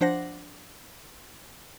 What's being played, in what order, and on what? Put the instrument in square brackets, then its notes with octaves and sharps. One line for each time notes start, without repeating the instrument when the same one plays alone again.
[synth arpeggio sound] F3 D4 C5 F#5 A#6